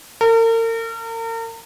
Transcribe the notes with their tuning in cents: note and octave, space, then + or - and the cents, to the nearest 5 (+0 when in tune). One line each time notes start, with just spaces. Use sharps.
A#4 -40